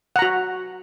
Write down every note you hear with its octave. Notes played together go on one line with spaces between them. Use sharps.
F#4 F#5 A#5